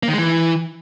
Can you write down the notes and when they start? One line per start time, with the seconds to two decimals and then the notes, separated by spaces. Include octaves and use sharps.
0.03 A#3
0.08 D#3
0.13 G#3
0.18 E3